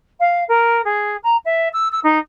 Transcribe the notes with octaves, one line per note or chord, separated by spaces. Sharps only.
F5
A#4
G#4
A#5
E5
E6
E6
D#4